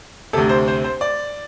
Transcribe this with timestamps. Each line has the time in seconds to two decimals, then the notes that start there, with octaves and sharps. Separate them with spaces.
0.33 D2 C3 A4
0.49 C5
0.68 C5
0.84 C5
1.01 D5